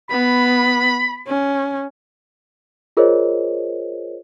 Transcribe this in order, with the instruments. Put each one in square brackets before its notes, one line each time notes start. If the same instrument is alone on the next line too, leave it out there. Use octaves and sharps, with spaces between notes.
[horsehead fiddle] B3 [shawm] B5
[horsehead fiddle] C#4
[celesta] F4 G#4 A#4 C5 C#5 D#5